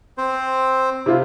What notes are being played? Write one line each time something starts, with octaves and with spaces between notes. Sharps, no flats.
C4 C5
C3 E4 F4